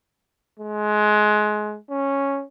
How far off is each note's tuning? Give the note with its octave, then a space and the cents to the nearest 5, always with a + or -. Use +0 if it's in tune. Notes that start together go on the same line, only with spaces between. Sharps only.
G#3 +25
C#4 -5